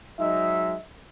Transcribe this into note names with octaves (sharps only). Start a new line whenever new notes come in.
F#3 G#3 D#4 E5